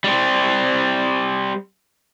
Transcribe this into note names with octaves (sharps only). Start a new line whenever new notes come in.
G3 C4